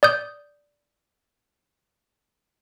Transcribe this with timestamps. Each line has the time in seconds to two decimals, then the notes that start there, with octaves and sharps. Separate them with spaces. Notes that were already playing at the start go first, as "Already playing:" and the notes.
0.03 D5 D#6 G6